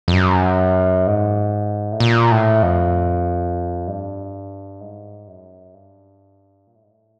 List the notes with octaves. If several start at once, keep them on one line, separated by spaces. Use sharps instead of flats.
F2
F#2
G#2
A2
A#2
A2
F2
G2
G#2
F#2
G2
A#2
A2
G#2
A2